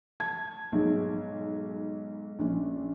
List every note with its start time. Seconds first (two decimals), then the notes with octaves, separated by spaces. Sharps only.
0.20 A5 G#6
0.72 B1 G#2 G#3
2.39 A#1 C#4 D4